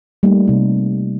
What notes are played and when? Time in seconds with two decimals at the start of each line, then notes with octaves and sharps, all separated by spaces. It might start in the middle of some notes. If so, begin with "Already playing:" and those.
0.23 G3 A3 A#3 D#4
0.48 C3 D#4